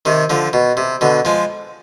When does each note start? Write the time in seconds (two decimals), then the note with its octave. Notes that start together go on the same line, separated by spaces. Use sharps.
0.05 C3 D#3
0.30 D3 F3
0.53 B2
0.77 C3
1.01 B2 D3
1.25 F3 G#3